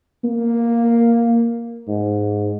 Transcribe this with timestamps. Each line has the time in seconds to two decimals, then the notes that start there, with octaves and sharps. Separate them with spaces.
0.24 A#3
1.88 G#2